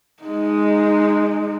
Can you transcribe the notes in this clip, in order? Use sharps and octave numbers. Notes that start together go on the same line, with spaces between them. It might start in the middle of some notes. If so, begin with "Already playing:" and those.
G#3 D#4